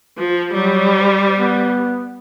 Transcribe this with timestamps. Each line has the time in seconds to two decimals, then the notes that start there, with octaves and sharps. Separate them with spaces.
0.18 F3
0.53 F#3 G3
0.98 C5
1.38 B3